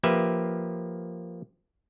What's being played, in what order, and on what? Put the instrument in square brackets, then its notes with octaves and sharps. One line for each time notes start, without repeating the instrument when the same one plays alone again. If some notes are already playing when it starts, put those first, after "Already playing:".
[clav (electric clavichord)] F3 A#3 G4 B4 E5